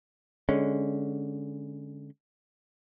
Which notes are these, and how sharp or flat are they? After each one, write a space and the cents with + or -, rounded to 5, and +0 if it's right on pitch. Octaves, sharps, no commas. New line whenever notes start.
D3 -10 G#3 +0 C#4 +0